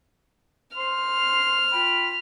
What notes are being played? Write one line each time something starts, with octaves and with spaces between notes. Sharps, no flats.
C5 C6 F6
F4 G5 B5